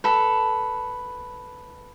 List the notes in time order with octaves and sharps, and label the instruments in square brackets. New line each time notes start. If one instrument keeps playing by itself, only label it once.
[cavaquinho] A4 B4